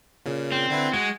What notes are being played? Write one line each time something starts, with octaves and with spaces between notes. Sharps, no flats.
A#2 C#3
C4
D3 E4 B4
G#3 F#4